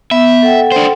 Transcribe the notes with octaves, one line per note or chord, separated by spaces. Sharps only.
B3 E5
A4 F#5 G5
D4 C5